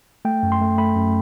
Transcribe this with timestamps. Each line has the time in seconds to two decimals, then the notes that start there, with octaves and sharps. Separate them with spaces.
0.25 A3 G5
0.43 F#2
0.52 C6
0.61 A3
0.78 A3 B5
0.96 F#2